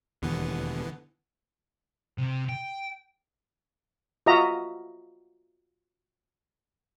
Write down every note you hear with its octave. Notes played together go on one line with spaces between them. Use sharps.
E1 D#2 D3 E3 B3
C3
G5
F4 F#4 D#5 E5 A#5